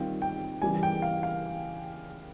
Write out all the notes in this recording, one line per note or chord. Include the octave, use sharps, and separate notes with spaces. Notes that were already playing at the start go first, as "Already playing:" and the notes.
Already playing: D#3 G3 C4 F4 G5
G5
C#3 E3 G3 G#5
G5
F5
F5